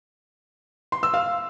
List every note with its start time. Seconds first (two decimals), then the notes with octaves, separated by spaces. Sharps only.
0.92 C6
1.03 E6
1.14 F5